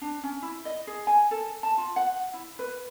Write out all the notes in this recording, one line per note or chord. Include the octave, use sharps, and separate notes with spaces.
D4
C#4
E4
D#5
G#4
G#5
A4
A5
F4
F#5
E4
B4